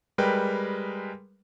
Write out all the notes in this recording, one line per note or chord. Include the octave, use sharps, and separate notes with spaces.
G3 G#3 A#4 B4 G5